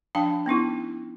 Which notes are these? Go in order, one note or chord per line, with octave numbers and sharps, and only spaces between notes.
F3 D4 F5 G5 A5
B3 C#4 D#4 E4